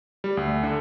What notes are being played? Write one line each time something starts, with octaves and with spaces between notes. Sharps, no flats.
G3
D2
D3